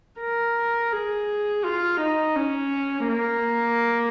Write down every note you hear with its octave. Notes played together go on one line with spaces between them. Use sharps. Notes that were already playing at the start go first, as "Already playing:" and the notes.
A#4
G#4
F4
D#4
C#4
A#3